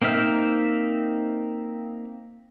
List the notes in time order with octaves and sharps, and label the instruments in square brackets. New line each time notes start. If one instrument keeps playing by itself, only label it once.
[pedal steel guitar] A#3 C4 D#4 E5 F6